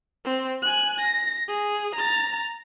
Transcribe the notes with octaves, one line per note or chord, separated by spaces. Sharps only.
C4
G#5 F#6
A#6
G#4
A#5 A6